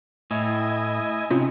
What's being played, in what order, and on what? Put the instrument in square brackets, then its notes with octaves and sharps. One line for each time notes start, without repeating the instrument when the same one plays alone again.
[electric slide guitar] A2 [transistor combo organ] E4 D#5 G#5
[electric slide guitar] C3 [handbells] C#4 F4 [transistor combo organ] D#4